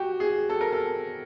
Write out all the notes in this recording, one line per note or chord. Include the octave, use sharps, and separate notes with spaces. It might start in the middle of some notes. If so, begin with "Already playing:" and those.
Already playing: F#4 G4
G#4
A4
A#4
A4